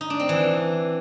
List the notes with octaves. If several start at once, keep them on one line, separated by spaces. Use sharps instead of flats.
D#4
D4
C4
E3